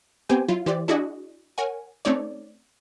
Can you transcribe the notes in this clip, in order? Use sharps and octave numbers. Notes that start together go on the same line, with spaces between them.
B3 C4 G4 G5 G#5
F#3 E4 F4
E3 G4 C5 D5
D4 E4 F#4 G#4 D5 D#5
A#4 C#5 F#5 G#5
A3 C4 C#4 D#4 C#5 D5